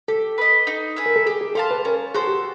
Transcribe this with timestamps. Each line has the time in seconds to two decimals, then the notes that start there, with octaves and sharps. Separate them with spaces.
0.08 G4 A4
0.38 B4 D#5
0.67 D#4
0.96 G#4 B4 E5
1.06 A#4
1.16 A4
1.26 G4 G#4
1.41 G#4
1.55 A4 C5 F5 A5
1.71 B4
1.85 C#4 A#4
2.14 F#4 G#4 A4 C5
2.27 G4